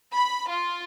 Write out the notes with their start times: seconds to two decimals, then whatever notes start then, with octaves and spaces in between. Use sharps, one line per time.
0.14 B5
0.48 F4